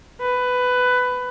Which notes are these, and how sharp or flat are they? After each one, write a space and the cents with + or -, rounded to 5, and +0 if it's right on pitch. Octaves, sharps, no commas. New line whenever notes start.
B4 +15